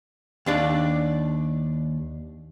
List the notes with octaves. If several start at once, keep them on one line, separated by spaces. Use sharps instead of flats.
D#2 D4 D5